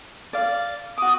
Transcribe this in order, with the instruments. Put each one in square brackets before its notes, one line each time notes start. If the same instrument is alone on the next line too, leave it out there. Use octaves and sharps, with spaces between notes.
[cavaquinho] D5 F5
[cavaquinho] F#4 D6 [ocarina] D#6